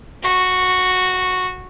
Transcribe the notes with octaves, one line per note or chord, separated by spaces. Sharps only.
F#4 C#6